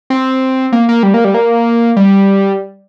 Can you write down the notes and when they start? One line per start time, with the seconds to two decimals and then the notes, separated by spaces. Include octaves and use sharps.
0.10 C4
0.72 A#3
0.89 A#3
1.03 G3
1.14 A#3
1.25 G3
1.34 A#3
1.97 G3